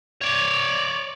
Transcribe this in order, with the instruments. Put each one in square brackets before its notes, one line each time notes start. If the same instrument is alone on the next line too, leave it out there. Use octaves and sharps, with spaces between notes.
[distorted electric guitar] C#5 D5